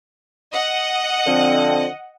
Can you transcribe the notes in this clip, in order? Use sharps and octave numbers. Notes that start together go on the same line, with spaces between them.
D#5 F#5
D3 F3 C4